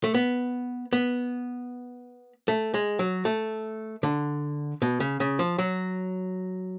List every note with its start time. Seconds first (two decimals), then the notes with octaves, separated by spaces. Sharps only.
0.04 A3
0.14 B3
0.93 B3
2.48 A3
2.74 G#3
2.99 F#3
3.25 A3
4.03 D3
4.82 B2
5.00 C#3
5.20 C#3
5.39 F3
5.58 F#3